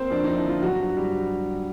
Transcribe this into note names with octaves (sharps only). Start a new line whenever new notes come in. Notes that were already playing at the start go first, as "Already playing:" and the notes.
Already playing: A#3 C4 C5
F2 D4
F3 D#4
E4
D3 F4
G2 F#3 F#4
G2
G3 G4